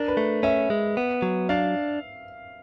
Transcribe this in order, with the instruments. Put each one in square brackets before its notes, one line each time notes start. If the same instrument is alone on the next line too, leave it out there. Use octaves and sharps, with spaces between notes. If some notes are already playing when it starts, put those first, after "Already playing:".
Already playing: [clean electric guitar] D4 [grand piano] A#4
[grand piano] B4
[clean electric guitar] A3
[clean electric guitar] C#4 [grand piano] E5
[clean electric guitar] G#3
B3
F#3
[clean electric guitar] D4 [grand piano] F5